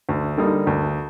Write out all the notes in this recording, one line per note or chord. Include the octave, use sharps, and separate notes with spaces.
D2
D3 G3 A#3 D#4
D2